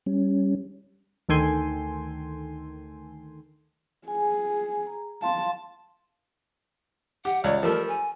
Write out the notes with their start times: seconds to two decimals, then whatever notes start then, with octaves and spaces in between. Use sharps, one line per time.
0.06 G3 C#4
1.29 D2 D#3 A4 G5 G#5 C6
4.08 G#4 G#5
4.87 A#5
5.22 F5 A5 C6
7.25 G4 F#5
7.44 C#2 C#5 D5
7.63 F3 G3 A3 A#4
7.88 G#5